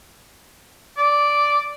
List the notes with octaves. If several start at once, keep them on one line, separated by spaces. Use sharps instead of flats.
D5